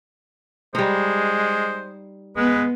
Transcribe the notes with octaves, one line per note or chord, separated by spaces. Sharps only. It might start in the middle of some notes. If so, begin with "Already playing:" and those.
G3 G#3 D#4 C5
G#3 B3 B4